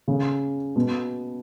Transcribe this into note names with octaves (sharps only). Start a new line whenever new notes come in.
C#3
B2